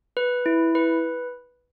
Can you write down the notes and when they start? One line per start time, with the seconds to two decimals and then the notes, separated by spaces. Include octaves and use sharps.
0.17 B4
0.46 E4
0.75 B4